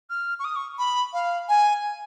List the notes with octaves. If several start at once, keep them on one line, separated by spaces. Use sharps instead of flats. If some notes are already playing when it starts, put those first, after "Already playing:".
F6
C#6
D#6
C#6
B5
F5
G#5